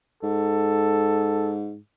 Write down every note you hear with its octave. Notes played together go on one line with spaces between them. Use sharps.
G#2 A4